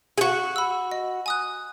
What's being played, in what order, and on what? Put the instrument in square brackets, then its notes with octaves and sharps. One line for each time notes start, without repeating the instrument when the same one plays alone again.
[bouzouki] G#4
[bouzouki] F#4 [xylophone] F#5
[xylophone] B5 E6
D#5
G#5 D#6 F#6